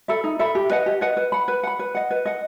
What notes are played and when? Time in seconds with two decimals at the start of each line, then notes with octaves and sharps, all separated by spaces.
0.08 A4 E5 B5
0.24 D#4
0.39 A4 E5 B5
0.55 G4
0.70 B4 D#5 F#5
0.86 G4
1.01 B4 D#5 F#5
1.17 B4
1.32 F#5 B5
1.48 B4
1.63 F#5 B5
1.79 B4
1.95 D#5 F#5
2.11 B4
2.25 D#5 F#5